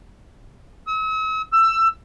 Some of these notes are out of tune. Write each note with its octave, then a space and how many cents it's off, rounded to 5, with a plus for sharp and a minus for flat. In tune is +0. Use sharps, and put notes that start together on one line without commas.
E6 -45
E6 +20